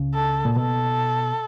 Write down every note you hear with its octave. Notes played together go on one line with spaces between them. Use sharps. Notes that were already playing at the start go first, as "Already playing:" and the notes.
Already playing: C#2 C#3
A4
A#2
B2 A4